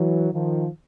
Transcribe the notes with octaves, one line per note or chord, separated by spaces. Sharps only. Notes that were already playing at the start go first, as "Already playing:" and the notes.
Already playing: E3 F#3
D#3 F3